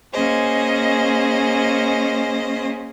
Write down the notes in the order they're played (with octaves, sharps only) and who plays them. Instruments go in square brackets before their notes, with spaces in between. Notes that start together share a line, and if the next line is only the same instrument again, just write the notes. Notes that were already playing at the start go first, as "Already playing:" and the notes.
[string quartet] A#3 C#4 G#4 C5 D#5